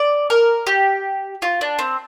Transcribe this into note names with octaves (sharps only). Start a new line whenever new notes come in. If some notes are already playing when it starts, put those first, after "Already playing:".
Already playing: D5
A#4
G4
F4
D4
C4